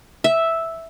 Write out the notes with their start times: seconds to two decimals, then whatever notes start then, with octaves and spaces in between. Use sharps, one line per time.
0.24 E5